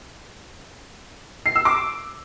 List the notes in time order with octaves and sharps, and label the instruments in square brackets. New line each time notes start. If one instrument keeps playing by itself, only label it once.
[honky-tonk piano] C7
E6
D6